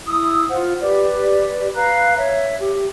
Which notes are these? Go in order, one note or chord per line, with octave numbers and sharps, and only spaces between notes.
E4 D#6 E6
F4 C5 F#5
G4 B4 D5
B4 F5 A#5 F#6
C#5 E5
G4